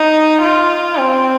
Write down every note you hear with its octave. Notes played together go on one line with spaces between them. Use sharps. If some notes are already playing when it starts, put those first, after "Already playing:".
Already playing: D#4
F4
C4